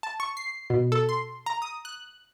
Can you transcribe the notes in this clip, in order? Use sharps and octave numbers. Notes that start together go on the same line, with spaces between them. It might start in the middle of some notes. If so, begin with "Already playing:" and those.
A5
C#6
C7
B2
A4
C6
A#5
D#6
F#6